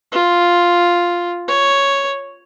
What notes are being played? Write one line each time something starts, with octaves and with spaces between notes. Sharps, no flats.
F4
C#5